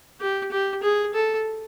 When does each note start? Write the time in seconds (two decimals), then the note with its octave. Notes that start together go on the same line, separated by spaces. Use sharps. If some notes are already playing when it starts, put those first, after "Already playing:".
0.20 G4
0.51 G4
0.83 G#4
1.14 A4